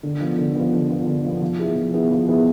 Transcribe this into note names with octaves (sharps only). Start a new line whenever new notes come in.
D3
F3 B3
D3
F3 B3
D3
F3 B3
D3
F3 B3
F3
B3 E4 G#4
F3
B3 E4 G#4
F3
B3 E4 G#4